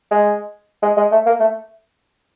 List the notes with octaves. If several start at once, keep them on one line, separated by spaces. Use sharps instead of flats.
G#3
G#3
G#3
A3
A#3
A3